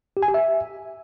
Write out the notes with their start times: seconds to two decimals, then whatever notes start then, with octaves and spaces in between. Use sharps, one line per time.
0.17 G4
0.23 G#5
0.28 G4
0.34 E5